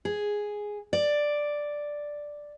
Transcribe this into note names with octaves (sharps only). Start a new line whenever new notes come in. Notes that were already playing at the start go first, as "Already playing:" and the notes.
G#4
D5